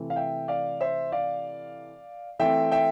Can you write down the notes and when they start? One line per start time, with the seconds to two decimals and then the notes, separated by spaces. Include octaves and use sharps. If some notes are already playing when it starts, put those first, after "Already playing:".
Already playing: C3 E3 A3 C4
0.10 F5
0.16 E5 G5
0.48 D5 F5
0.81 C5 E5
1.12 D5 F5
2.39 E3 A3 C4 E5 G5
2.72 E5 G5